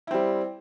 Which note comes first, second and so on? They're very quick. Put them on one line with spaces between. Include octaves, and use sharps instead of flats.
E4 C4 G3